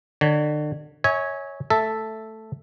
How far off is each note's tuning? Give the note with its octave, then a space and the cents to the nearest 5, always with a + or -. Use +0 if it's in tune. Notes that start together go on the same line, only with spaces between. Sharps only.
D3 +35 C#5 +30
C#5 +0 E5 -40 G#5 +0
A3 +0 A4 +0 E5 +0